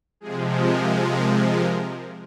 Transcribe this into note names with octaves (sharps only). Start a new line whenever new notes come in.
C3 F3 G#3 G#4
A#4
A#4
A#4